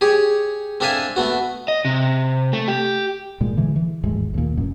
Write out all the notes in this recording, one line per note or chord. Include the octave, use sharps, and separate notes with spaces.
G4 G#4 C#5
C4 D4 A4 E5 F5 G#5
A3 B3 F#4
D#5
C3
A3
G4
G#1 A#2 G#3
D3 E3 G#3
E3
D#1 G#1 A2 G#3
D#2 A#2
F1 F#2